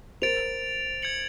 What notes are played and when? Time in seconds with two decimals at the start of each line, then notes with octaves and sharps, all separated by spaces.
0.22 A#4 C5 A6 D7 F7
1.02 G#6 C#7 F#7